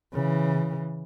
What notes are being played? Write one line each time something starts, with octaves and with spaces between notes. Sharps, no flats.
C#3 E3